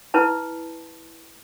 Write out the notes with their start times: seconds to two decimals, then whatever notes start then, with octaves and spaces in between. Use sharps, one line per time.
0.14 E4 B4 A5